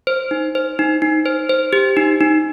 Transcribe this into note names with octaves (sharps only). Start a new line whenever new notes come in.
C5
D#4
C5
D#4
D#4
C5
C5
G4
D#4
D#4